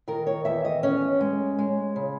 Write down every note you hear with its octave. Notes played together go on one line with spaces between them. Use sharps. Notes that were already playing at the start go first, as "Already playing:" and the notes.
D#3 A#4
C#5
E2 E5
D#5
C#4 C#5
G#3
G#3
C#3